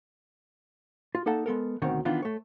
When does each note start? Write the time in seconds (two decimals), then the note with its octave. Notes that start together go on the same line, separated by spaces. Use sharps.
1.15 F4
1.26 A#3 D#4 A4 F#5 A5
1.46 G#3 B3 A4 A#4
1.82 D2 B2 D#3 C4 C#5 F#5
2.05 D#3 E3 B3 D4 D#4 F4
2.22 A3 C#5